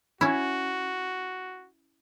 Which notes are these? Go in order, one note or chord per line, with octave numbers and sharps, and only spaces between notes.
C#4 E4 F#4